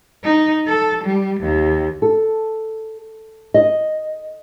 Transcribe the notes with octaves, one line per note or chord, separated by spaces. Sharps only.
D#4
A4
G3
D#2
A4
D#5